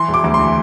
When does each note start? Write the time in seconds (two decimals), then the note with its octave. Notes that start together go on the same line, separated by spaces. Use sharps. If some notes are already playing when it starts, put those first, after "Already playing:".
Already playing: E3 C6
0.08 E1
0.14 D6
0.24 D2
0.34 C6
0.39 E3